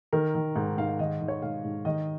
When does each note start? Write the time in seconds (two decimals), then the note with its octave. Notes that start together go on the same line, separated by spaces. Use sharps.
0.13 D#3 A#4
0.35 D#3
0.56 G#2
0.78 G#2 F5
0.99 D#3 D#5
1.21 D#3
1.28 C#5
1.42 G#2 F5
1.64 G#2
1.85 D#3 D#5